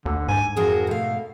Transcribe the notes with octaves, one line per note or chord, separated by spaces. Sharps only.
D#2 D3
G#2 G#5
F2 F#4 G#4 A#4
B2 A3 F5